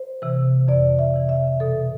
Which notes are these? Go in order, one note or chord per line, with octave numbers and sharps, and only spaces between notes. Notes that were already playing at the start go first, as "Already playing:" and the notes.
Already playing: C5
C3 E3
F2 D5
E5
C3 E3
E5
B2 A4